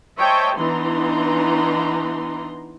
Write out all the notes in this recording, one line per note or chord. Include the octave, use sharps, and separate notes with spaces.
C5 C#5 D#5 E5 G5 A5
E3 B3 D4 D#4 A#5 C6